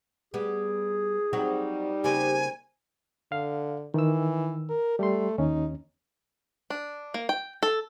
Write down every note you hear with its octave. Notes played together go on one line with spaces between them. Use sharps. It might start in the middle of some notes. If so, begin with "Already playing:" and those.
G3 B3 G#4
F#3 G3 C4 D#4 F#4
C#3 A#3 C4 G4 G#5
D3 F5
D#3 E3 E6
A#4
G3 A3 C6
D#2 C#4 D#4
D4
A#3
G5
A4